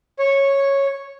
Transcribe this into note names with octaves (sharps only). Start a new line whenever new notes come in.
C#5